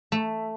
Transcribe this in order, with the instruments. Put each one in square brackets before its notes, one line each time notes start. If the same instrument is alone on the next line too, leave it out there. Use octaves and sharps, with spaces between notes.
[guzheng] A3